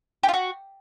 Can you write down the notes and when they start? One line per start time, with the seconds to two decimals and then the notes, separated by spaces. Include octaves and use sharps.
0.23 G4
0.28 F4
0.34 F#4